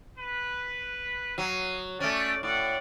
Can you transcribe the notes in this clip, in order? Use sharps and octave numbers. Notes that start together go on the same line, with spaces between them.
B4
F#3 F#4 F5 D#6
A3 C#4 D5
A2 D5 F#5